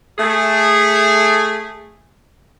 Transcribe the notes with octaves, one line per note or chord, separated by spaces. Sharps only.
A3 G#4